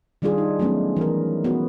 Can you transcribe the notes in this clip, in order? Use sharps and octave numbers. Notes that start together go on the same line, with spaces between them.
D#3 G3 D4 F4 G#4
D#4
F#3 A3 B3 C#4 D#4
E3 A#4
B3 F#4